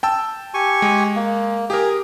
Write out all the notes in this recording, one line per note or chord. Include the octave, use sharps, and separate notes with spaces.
G5 A5 E6
G4 G#5 C#6
G#3
A#3
G4 G#4 A#4